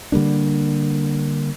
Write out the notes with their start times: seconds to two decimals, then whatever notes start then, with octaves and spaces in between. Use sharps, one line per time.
0.12 D3 G3 A#3 D4